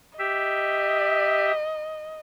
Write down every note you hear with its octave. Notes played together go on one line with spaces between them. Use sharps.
G4 D#5 E5